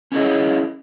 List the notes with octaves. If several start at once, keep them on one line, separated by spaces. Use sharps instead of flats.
C#4 D4 E4 G#4 C#5 D#5